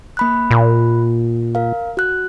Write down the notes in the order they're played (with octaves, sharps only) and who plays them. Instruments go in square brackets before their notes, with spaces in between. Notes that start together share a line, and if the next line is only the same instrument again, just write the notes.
[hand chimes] A#3 B5 F#6
[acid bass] A#2
[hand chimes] A#4 F5
F#4 F#6